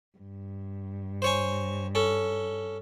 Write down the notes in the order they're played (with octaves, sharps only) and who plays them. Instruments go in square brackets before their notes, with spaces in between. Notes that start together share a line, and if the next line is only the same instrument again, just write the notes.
[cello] G2
[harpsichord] C5 C#5 G#5
C#4 A4